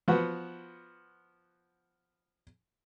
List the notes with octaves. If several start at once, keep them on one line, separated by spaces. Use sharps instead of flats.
F3 B3 F#4